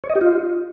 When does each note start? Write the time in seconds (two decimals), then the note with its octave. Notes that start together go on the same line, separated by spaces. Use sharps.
0.04 C#5
0.09 D#5
0.15 G4
0.21 F4